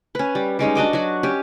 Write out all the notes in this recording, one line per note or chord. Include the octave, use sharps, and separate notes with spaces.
C#4 B4
G3
G3 G#3 C#4 D#4
D4 F#4 D#5 D6
F#3 F#4
C#4 G4